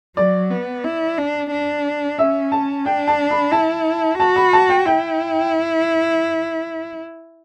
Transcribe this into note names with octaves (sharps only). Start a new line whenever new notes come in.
F#3 D5
B3
E4
D4
D4
C#4 E5
A5
D4 G5
A5
B5
E4 A5
F#4 A5
B5
A5
G5
E4 G5